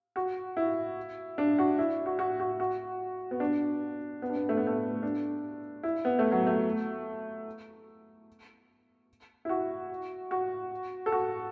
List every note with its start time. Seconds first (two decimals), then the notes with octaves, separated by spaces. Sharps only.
0.16 F#4
0.57 E4
1.38 D4
1.58 F#4
1.79 E4
2.06 F#4
2.19 F#4
2.40 F#4
2.60 F#4
3.31 B3
3.40 D4
4.22 B3
4.30 D4
4.36 B3
4.49 A3
4.57 B3
4.67 A3
5.03 D4
5.83 E4
6.05 B3
6.19 A3
6.32 F#3
6.47 A3
9.45 E4
9.49 F#4
10.31 F#4
11.06 A4
11.12 F#4